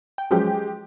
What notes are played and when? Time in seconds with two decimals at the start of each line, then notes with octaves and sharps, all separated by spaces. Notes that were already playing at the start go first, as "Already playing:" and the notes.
0.18 G5
0.31 F3 F#3 G#3 C#4 G4